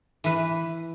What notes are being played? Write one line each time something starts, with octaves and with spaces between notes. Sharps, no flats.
E3 B4